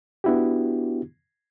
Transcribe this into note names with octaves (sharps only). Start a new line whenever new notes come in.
B3 D4 E4 F#4 G4